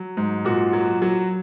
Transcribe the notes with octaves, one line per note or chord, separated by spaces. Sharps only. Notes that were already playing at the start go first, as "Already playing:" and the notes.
Already playing: F#3
G#2
A#2 F#4
F#3
F#3